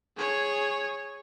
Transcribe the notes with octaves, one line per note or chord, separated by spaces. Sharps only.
G#4 C#5